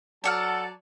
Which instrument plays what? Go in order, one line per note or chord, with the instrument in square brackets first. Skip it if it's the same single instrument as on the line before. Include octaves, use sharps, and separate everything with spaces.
[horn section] F#3 D5 A5 [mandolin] A4 F#5 F6